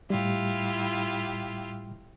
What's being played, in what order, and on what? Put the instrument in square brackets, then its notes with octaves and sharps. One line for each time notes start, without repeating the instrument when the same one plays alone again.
[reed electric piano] A2 G3 [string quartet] E4 F4 G4